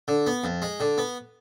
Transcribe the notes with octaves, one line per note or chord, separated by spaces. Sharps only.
D3
B3
F2
G#3
D3
B3